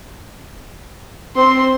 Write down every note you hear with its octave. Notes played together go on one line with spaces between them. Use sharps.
C4 C6